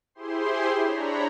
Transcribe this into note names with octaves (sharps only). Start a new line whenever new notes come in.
E4 G4 G#4 C5 C6
D4 C#5 A#5 B5